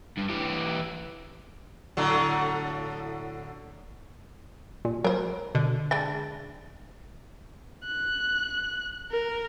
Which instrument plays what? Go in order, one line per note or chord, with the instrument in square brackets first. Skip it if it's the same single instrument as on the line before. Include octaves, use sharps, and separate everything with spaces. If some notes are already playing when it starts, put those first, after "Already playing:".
[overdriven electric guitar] G2
E3 G4
[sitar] A2 D3 F#3
[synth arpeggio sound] A#2
[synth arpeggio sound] F#3 [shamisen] A#4 C5
[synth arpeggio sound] B2 [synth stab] D3
[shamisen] G#3 D4 G5 [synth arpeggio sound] A6
[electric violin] F#6
A#4